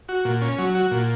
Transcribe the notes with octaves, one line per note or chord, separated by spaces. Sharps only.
F#4
A#2
C#4
F#3
F#4
A#2